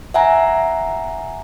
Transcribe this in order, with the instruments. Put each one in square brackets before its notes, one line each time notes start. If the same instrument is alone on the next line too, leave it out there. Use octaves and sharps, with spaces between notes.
[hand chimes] E5 F#5 G#5 A#5